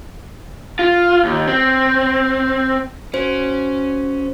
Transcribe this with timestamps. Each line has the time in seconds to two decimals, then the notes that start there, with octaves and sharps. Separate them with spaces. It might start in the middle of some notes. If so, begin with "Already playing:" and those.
0.79 F4
1.25 D#2
1.47 C4
3.14 C#4 F#4 C5